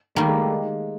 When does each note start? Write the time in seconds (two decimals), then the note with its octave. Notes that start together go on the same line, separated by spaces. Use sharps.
0.15 D#3 G3 A3 A#3
0.27 G#3
0.38 A3
0.50 G#3